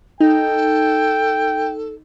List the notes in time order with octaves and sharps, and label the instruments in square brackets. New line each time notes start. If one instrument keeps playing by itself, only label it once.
[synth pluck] D#4 [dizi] A4 [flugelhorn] G5